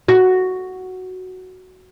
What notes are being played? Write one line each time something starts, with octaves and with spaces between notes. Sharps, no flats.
F#4